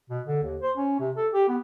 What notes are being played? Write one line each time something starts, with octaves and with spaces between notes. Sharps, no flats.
B2
D3
D#2
C5
C#4
C3
A4
G4
B3